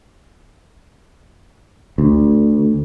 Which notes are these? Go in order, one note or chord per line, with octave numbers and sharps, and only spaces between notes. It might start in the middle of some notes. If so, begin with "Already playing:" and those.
D2